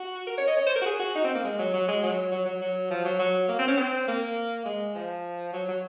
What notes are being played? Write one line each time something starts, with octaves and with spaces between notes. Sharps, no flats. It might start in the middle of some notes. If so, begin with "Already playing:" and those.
Already playing: F#4
A#4
C#5
D#5
C#5
C5
A#4
F#4
G#4
F#4
D#4
C4
A#3
G#3
F#3
F#3
G#3
F#3
F#3
F#3
F#3
F3
F#3
F#3
A#3
C4
C#4
C4
A#3
G#3
F3
F#3
F#3